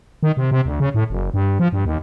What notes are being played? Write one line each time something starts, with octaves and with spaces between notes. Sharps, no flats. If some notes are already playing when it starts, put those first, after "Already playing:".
D#3
C3
C3
D2
C#3
A2
F#1
G2
F3
G2
D#2